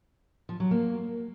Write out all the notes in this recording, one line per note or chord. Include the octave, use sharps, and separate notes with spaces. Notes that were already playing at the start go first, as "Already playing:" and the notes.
F3
F#3
A#3